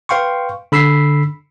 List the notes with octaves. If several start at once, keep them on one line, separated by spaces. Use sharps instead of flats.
B4 F5 G5 C6 C#6
D3 B5 E6 B6 C7